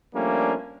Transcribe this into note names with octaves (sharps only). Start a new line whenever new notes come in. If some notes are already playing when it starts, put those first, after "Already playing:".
F3 G3 A3 A#3 C#4 D4